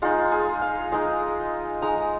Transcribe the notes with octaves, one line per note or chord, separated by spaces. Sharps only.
G#3 D#4 F4
G#4
F5
G#3 D#4 D#5
G#3 D#4 A#5